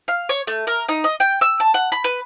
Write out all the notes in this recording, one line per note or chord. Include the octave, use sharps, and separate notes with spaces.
F5
C#5
A3
A#4
D#4
D#5
G5
E6
A5
F#5
B5
B4